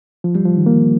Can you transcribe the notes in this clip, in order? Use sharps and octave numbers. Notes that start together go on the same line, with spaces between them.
F3
G3
F3
D#3
A#3